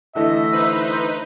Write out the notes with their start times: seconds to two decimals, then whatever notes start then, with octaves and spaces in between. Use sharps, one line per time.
0.15 D3 E3 A3 D#5 E5
0.53 D#4 B4 C5